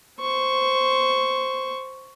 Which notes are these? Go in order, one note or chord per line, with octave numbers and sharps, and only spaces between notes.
C5 C#6